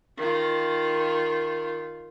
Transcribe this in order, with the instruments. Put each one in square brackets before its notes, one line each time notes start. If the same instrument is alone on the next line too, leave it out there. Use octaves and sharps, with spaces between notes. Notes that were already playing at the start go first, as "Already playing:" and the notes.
[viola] D#3 F4